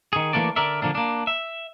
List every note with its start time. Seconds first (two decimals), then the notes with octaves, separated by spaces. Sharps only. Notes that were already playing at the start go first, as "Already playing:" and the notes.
0.13 D#3 G#4
0.33 E3 A3 A#3 D4 D5
0.56 D3 A#4 D5 E5
0.82 D3 F3 A#3 D4
0.95 A#3 D4
1.27 E5